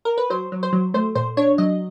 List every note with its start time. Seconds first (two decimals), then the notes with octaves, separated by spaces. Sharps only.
0.05 A#4
0.18 B4
0.30 F#3 C5
0.52 F#3
0.63 C5
0.73 F#3
0.94 A3 C5
1.15 A#2 C5
1.37 D4 C#5
1.58 F#3 D#5